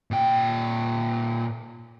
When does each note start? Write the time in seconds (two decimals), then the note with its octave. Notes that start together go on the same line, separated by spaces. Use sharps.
0.11 A#2 G5